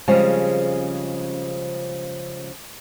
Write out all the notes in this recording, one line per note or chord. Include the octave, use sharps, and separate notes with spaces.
C#3 F3 G3 G#3 C4 C#4